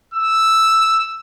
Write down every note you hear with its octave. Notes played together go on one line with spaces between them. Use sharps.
E6